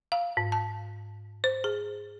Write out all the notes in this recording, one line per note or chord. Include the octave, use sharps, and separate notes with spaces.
F5
G#2
A5
C5
G#4